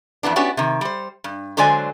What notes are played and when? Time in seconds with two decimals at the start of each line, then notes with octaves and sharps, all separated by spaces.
0.23 F2 E3 B3 D4
0.36 B3 C#4 D4 F#4 G4
0.57 C3 D#3
0.81 G3 C5
1.24 G2
1.57 D3 F#3 G#3 C5 D5 G#5